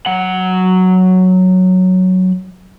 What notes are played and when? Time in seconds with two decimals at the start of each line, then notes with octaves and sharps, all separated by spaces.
0.06 F#3 F#5